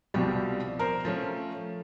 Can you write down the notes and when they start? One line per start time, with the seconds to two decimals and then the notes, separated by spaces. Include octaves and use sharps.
0.14 C2 B2 F3 G3
0.79 A#4 C5
1.05 F3 A3 C#4